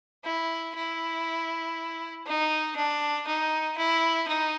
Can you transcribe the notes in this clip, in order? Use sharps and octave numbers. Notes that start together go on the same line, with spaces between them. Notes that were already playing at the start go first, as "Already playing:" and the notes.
E4
E4
D#4
D4
D#4
E4
D#4